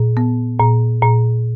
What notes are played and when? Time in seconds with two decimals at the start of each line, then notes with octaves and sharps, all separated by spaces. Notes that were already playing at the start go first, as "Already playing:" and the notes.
Already playing: A#2
0.17 B3
0.59 A#2
1.02 A#2